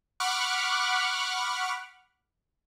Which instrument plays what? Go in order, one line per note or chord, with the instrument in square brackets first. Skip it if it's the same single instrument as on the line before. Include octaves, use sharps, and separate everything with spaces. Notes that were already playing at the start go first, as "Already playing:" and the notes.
[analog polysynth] F#5 B5 C#6 D6 F6 F#6